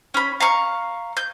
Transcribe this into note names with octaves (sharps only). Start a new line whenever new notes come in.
C#4 B5
F5 A#5 C#6
G6